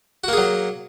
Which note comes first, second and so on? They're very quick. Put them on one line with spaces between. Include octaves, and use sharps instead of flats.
F#4 A#3 G#4 F#3